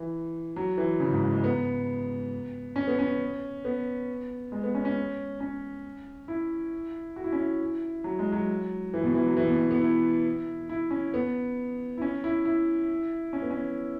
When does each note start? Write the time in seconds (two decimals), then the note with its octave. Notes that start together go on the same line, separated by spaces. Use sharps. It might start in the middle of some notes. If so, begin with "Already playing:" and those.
Already playing: E3
0.56 F#3
0.77 E3
1.00 C#3
1.11 G#2
1.22 G#2
1.33 G#3
1.44 B3
2.76 C#4
2.87 B3
2.99 C#4
3.65 B3
4.52 G#3
4.64 B3
4.75 C#4
4.85 C#4
5.40 C#4
6.28 E4
7.16 F#4
7.24 E4
7.32 C#4
7.39 E4
8.04 F#3
8.19 G#3
8.32 F#3
8.94 E3
9.04 B2
9.14 E3
9.27 F#3
9.37 E3
9.47 B2
9.59 B2
9.71 B3
9.81 E4
10.69 E4
10.91 C#4
11.14 B3
11.98 E4
12.02 C#4
12.24 E4
12.45 E4
13.33 C#4
13.42 B3
13.51 C#4